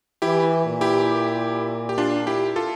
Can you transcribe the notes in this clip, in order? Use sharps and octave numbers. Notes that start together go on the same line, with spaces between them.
E3 E4 G4
A#2
E4 G4
G4
D4 F4
E4 G4
F4 A4